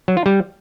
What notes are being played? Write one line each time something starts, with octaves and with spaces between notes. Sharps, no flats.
F#3
F4
G3